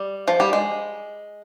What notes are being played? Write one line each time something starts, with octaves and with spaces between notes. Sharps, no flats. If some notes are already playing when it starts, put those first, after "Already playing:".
Already playing: G3
F3
G3
G#3